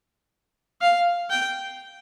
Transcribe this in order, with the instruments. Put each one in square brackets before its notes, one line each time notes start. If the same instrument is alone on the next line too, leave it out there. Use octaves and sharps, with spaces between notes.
[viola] F5
G5